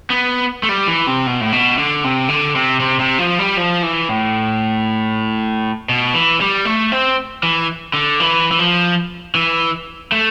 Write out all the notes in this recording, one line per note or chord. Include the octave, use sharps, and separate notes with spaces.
B3
A3
G3
E3
C3
B2
A2
B2
D3
C3
D3
C3
C3
C3
F3
G3
F3
E3
A2
B2
E3
G3
A3
C4
E3
D3
E3
E3
F3
E3
A3